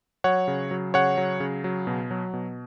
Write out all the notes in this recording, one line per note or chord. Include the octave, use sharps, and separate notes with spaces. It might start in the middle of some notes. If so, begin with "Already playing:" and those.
F#3 C#5 F#5
C#3
F#3
C#3 C#5 F#5
F#3
C#3
F#3
B2
F#3
B2